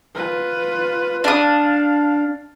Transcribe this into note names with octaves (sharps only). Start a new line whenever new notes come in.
F4 B4
D4 F5 D#6